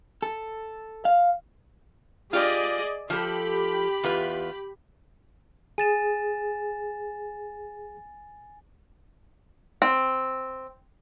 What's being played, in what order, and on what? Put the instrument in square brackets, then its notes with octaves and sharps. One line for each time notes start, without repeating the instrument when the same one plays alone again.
[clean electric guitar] A4
F5
[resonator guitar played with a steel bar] F4 G4 [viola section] G#4 D5 D#5
[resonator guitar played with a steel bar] F3 A4 [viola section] G4 B5
[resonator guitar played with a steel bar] E2 F4 B4
[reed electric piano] G#4 [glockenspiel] G#5 A6 E7
[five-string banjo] C4